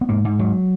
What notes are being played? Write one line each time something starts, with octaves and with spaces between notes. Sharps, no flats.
B3
G#2 A#3
G#2
G#2 F#3